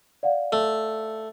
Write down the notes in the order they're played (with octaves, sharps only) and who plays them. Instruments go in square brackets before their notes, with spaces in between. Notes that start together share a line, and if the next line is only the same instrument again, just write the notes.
[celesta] D5 F5 F#5
[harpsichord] A3